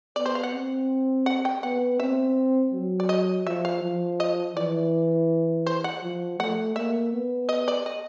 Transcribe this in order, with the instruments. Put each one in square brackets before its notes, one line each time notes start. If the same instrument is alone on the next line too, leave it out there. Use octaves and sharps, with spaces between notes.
[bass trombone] B3 [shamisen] D5
[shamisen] C5
F5
F#5
[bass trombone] C4
[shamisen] F#5
G5
[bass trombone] B3 [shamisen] F#5
[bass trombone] C4 [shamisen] E5
[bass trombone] F#3
[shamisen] D5
D#5
[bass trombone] F3 [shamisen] E5
[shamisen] F5
[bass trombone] F3
[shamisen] D#5
[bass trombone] E3 [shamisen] D5
[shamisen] C5
F#5
[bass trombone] F3
[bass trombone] A3 [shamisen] F#5
[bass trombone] A#3 [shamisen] E5
[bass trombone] B3
[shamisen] D#5
D5
D#5